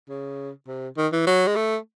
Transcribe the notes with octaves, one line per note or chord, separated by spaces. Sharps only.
C#3
C3
D#3
E3
F#3
G#3
A3